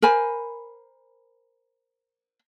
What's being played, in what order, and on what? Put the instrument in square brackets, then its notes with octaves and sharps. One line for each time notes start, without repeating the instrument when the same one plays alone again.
[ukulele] A#4 C5 G#5 B5